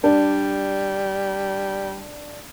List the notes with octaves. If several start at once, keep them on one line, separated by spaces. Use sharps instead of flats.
G3 D4